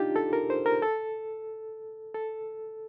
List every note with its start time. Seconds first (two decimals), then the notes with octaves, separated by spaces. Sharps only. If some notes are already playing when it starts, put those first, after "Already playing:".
Already playing: D4 D#4 F4 G4
0.16 A4
0.33 A#4
0.50 C5
0.66 A#4
0.82 A4
2.14 A4